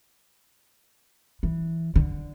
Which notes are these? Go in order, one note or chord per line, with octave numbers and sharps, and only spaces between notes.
E3
D3